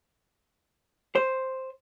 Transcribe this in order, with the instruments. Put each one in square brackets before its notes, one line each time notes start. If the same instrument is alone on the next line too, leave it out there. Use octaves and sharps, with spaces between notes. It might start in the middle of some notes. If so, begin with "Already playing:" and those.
[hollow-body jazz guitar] C5